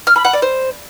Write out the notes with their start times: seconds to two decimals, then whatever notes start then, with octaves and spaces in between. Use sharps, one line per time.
0.07 F6
0.16 B5
0.25 F#5
0.33 D5
0.42 C5